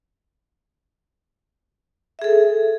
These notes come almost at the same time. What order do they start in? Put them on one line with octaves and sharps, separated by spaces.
E5 G#4 A4